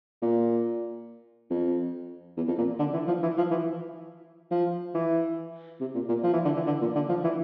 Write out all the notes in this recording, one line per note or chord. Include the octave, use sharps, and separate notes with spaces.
A#2
F2
E2
F2
A#2
D3
E3
F3
E3
F3
E3
F3
E3
C3
A#2
A#2
F3
E3
D3
E3
D3
A#2
D3
F3
E3